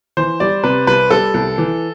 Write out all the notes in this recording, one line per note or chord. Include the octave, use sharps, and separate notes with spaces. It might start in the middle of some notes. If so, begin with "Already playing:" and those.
E3 C5
G3 D5
C3 B4
C2 B4
G3 A4
C2
E3